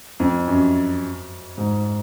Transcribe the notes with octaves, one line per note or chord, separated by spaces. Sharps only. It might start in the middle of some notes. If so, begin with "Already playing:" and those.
F2
F#2
G#2